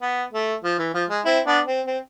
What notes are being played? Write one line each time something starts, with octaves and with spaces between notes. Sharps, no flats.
B3
A3
F3
E3
F3
G#3
C4 E4
B3 D4
C4
C4